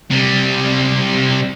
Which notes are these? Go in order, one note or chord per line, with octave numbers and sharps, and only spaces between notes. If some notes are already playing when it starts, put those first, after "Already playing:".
C3 G3